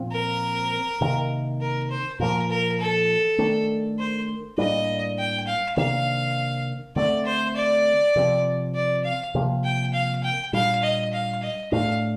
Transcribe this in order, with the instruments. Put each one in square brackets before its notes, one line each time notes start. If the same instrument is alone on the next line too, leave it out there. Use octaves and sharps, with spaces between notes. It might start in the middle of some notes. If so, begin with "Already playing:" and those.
Already playing: [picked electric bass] A#2 F3 C4
[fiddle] A#4
[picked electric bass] C3 D#3 A#3
[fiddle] A#4
C5
[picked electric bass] A#2 F3 A#3 [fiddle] A#4
[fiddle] A#4
A4
[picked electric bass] D#3 A3 D4
[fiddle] C5
[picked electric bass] A2 G3 A#3 D4 [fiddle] D#5
[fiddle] G5
F5
[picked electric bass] C3 D#3 A#3 D4 [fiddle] F5
[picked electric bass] D3 A3 C4 [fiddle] D5
[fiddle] C5
D5
[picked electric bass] C3 F3 C4
[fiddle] D5
F5
[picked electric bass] C3 F3 A#3
[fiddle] G5
F5
G5
[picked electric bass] A#2 G3 D4 [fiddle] F5
[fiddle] D#5
F5
D#5
[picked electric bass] A2 A3 D4 [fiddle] F5